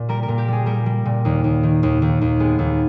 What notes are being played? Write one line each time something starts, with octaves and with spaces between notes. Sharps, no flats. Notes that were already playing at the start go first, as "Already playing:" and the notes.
Already playing: A#2
G3 A#4
A#4
A#2
G4
G3 G#4
G3 A#4
G3
A#2
D#2
D#2
D#3
D#2
D#2
D#2
G#3 B3
D#2